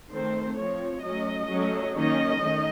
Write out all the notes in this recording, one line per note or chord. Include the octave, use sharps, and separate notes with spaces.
D#3 A3 C4 C5
F3 C4 C#5
F#3 A3 C#4 D#5
F#3 A3 C#4
D#3 A#3 C#4 D#5
D#3 A3 C#4